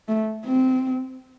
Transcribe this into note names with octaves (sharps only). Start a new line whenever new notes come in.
A3
C4